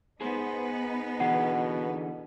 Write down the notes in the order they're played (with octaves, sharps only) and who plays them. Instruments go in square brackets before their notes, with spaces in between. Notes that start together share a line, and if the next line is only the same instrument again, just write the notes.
[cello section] B3 D#4 B4 [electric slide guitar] G#4 C5
[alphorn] B2 [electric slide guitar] D3 E3 G#4 [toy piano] F#5